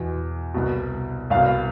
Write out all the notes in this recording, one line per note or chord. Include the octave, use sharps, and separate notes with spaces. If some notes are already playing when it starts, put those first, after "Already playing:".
Already playing: E2 B2
C2 B2
C2 B2 F5